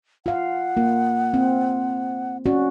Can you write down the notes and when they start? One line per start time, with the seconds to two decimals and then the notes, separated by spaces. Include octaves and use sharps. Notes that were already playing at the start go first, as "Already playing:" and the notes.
0.26 F4 F5 F#5
0.77 A#3 F4
1.34 C4
2.46 C#4 F#4 D5